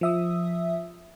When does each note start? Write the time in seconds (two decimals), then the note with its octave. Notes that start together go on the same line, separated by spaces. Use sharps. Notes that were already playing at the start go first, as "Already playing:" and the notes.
0.01 F3 E5 D#6